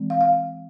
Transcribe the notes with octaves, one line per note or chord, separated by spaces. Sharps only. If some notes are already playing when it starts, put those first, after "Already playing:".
Already playing: E3 G#3 C4
F5
F5